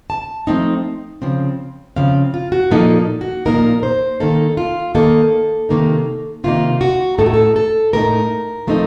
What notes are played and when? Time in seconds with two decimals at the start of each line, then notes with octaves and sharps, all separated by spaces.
0.10 A5
0.47 F3 A3 C4 D#4
1.22 C#3 F3 C4
1.96 C#3 F3 C4 F5
2.34 F4
2.52 F#4
2.71 A#2 F3 A#3 D#4 A4
3.21 F#4
3.46 A#2 F3 A#3 D#4 A#4
3.83 C5
4.20 D#3 A#3 D#4 A4
4.57 F4
4.95 D#3 A#3 D#4 A4
5.69 C3 D#3 A#3 D#4
6.44 C3 D#3 A#3 D#4 F4
6.81 F#4
7.19 A2 A3 D#4 A4
7.26 F#4
7.34 A4
7.56 A4
7.93 A2 A3 D#4 A#4
8.67 F3 A3 C4 D#4